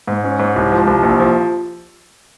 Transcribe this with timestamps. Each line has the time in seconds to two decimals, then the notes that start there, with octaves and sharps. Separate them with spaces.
0.07 G#2
0.24 C#4
0.39 G#2
0.56 C2
0.72 F3
0.87 C2
1.03 A#1
1.19 F3